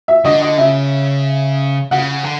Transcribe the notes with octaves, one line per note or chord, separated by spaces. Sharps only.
E5
D3 D#5
D#5
C#3 E5
C#3 F#5
D3